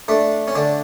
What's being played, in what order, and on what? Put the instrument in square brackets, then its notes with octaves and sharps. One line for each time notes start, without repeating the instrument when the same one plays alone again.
[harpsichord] A3 D4
C#4
D3 D4